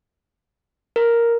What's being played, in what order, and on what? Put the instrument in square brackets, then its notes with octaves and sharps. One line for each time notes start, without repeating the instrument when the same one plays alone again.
[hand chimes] A#4